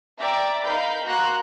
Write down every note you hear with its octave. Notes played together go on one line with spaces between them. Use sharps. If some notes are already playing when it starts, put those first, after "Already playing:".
D5 E5 G5 A#5 D6
D#4 A#4 F5 B5 G6
A#3 F#4 A#5 C6 F#6